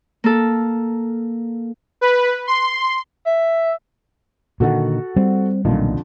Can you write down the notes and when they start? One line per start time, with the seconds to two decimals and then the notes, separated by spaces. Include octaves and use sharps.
0.24 A#3 A4
2.01 B4
2.47 C6
3.26 E5
4.60 A#2 D3 D#3 F#4 A4 F#5
5.16 G3 C4
5.65 B1 F2 A#2 D3 D#3 F3